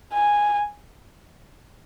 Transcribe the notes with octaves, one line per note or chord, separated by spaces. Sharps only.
G#5